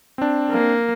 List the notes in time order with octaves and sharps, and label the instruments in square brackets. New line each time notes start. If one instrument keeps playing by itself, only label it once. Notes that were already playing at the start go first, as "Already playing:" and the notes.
[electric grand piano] C4 D4
[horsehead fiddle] A#3